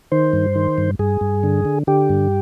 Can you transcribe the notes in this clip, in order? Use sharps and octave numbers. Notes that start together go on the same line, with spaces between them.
D#3 C5
G2
D#3
G2
G2 G#4
G2
D3
D3
D3 G4
G2